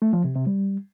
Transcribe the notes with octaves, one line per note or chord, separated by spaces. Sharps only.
A3
F3
C3
C3
G3